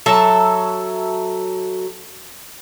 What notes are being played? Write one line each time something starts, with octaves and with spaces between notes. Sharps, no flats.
F#3 A4 E5